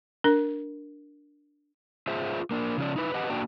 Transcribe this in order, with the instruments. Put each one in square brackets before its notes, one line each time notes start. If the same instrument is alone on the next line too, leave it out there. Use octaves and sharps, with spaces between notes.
[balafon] D4 A#4
[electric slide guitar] F4 G#4 C5 E5
A#3 D4
C#3 F3 C#4 D5
D#4 E4 B4
G4 B4 D#5 F#5
A#3 D4 F#4 G5